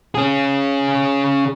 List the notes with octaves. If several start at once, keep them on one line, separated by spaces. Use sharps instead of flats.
C#4 G#4